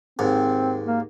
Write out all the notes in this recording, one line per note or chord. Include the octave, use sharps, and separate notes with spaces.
D#2 G#2 C4
A#3